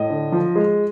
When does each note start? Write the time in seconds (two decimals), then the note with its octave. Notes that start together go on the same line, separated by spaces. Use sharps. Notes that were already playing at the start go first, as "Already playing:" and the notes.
Already playing: A2 D#5
0.10 D3
0.32 F3
0.56 G#3